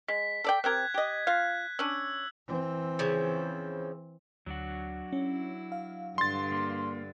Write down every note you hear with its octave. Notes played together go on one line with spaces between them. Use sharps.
G#3 B6
A4 D5 G5
C4 G4 A#4 F#6 G#6
G4 D#5
F4 F5 F#6
C#4 D4 E6
E3 C4
C#3 F3
D2 F#3 D4 F#4
C#4 E4
F5
G2 D3 C6 A6
A#3